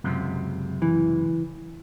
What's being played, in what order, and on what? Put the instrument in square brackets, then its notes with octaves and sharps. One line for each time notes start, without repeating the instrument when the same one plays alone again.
[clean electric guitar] C#2 F#2 C3
[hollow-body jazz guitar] E3